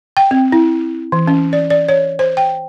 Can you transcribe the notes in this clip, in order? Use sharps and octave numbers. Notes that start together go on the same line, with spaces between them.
G5
C4
E4
E3
C#4
D5
D5
C#5
C5
G5